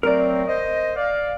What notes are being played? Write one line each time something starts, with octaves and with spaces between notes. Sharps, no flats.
F#3 A3 C4 A#4 D5
C5 D#5
D5 F5